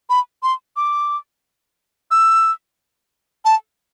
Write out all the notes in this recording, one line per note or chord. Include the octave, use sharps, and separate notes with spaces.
B5
C6
D6
E6
A5